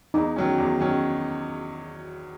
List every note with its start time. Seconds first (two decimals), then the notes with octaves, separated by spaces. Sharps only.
0.14 E2 D#4
0.36 D#3 F#3 C#4
0.58 E2
0.79 D#3 F#3 C#4